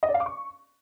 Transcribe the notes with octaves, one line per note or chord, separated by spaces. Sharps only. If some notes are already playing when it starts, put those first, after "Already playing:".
D#5
D5
F5
D6
C#6